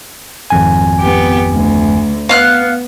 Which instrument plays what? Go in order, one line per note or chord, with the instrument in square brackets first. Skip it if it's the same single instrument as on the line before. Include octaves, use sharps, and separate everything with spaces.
[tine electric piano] G#1 F2 G#5
[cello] B3 G4
D2
[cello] B3 [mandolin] F5 F6 F#6